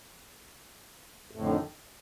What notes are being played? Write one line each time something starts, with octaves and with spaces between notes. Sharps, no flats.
F2 A2 D3 D#3